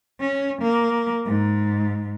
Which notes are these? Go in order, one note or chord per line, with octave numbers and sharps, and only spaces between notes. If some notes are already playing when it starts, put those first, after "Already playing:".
C#4
A#3
G#2